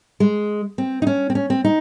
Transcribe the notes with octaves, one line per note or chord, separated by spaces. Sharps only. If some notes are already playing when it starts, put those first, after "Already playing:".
G#3
C4
D#4
C#4
C4
C#4
C4
D#4